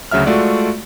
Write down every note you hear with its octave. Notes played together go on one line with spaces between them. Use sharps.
D2 C#3 F#3 E5 F6
G#3 A3 F4 F#4 D5 E5